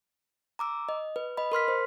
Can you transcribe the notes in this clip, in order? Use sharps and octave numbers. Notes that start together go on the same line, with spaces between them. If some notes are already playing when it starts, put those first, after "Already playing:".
A#5 D6 E6
D#5
B4
D#5 B5
A#4 C6 F6 B6
C5